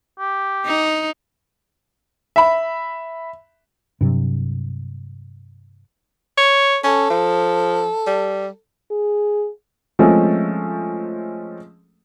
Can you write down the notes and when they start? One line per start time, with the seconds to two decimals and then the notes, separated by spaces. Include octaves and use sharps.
0.19 G4
0.66 D#4
2.36 E5 B5
4.01 G2 C3 F#3
6.38 C#5
6.84 C#4 A4
7.10 F3
8.07 G3
8.91 G#4
9.99 F3 G#3 A3 C4 C#4 A4